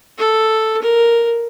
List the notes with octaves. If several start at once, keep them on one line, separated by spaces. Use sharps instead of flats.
A4
A#4